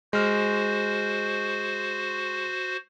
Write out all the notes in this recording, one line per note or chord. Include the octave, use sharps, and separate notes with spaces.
G#3 F#4 C5 F6